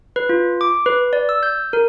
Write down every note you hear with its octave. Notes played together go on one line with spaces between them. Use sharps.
B4
F4
D6
B4
D5
E6
G6
A#4